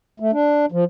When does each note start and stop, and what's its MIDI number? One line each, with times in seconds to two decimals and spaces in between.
0.20 0.31 57
0.32 0.66 62
0.72 0.84 53